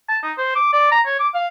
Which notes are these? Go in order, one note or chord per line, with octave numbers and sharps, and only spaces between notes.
A5
D#4
C5
D6
D5
A#5
C#5
D6
F5